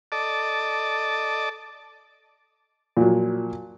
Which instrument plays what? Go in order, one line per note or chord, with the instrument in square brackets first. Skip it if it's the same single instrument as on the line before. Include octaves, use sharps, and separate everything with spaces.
[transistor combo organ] A4 D5 D#5 A5 D6
[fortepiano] A#2 F3 F#3